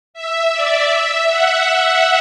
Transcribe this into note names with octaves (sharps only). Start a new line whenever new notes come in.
E5
D5
E5
F#5